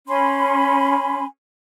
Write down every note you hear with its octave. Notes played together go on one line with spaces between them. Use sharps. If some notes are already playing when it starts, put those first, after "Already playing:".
C#4 G#5 B5 C6